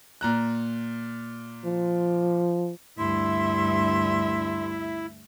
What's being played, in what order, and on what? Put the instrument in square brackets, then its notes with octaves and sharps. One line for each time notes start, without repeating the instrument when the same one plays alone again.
[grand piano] A#2 A#5 F#6
[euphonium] F3
[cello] D2 E5 [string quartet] G2 [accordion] E4 [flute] C6